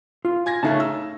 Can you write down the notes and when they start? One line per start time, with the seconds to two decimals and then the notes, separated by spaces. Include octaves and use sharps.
0.25 F4
0.46 G#5 G#6 A#6
0.63 C#3 A3 C#4 D#4 A5
0.80 E6